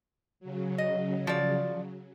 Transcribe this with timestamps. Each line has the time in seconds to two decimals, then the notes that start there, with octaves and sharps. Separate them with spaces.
0.40 C#3 F#3
0.78 D#5
1.27 F3 D5